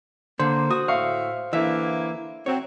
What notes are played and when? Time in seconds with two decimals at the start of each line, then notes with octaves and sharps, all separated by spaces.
0.40 D3 A#3 C5
0.70 F#4 D#6
0.88 A2 E5 F5 C#6
1.53 D3 E3 A#3 E4 E5
2.46 F#3 C4 C#5